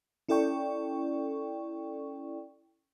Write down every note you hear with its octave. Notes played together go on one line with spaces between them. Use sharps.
C#4 E4 A4 D5 G5 C#6